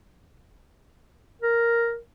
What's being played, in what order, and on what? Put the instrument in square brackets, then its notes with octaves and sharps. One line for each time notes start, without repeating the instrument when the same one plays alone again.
[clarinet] A#4